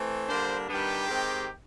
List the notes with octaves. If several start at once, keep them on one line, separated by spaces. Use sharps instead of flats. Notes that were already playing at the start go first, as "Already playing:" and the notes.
Already playing: E3 A3 C4
D3 G3 A#3 D4 C5
D#3 G3 B3 D4 G4
D#3 G#3 C4